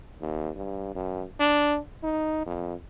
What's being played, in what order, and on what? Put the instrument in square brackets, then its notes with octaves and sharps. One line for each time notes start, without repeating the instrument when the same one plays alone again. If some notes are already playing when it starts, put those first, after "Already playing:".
[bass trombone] D#2
G2
F#2
D4
D#4
F2